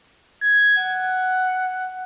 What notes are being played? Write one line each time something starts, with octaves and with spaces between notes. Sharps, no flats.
G#6
F#5